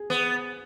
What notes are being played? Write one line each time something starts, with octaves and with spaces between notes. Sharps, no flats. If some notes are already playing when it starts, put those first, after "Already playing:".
Already playing: G#4
B3